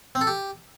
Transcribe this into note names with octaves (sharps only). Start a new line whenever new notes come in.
C4
A4
G4